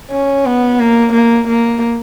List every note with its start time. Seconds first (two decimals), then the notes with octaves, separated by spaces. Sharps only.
0.11 C#4
0.46 B3
0.80 A#3
1.13 A#3
1.47 A#3